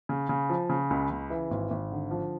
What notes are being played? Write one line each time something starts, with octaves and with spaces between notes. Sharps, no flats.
C#3
C#3
F3
C#3
C#2
C#3
E3
G#1
G#1
D3
F3